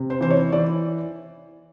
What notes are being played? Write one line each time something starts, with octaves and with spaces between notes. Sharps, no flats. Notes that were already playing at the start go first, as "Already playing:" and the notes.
Already playing: C3
C5
E3 C5
C#5
E3 D5